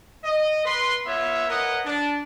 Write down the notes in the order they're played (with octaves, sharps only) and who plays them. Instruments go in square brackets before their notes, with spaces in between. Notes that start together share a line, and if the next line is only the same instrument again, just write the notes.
[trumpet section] D#5
B4 C6
B3 F4 C#5 E5
A#4 B4 C#5 D#5 F#5
D4